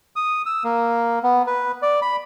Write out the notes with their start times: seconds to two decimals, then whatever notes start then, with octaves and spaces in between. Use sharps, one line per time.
0.16 D#6
0.46 E6
0.64 A#3
1.23 B3
1.47 B4
1.82 D5
2.02 B5